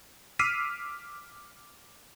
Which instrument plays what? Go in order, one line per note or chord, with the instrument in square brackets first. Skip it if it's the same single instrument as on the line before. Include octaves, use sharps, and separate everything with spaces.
[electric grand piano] D6 E6 F6 B6 C7 D#7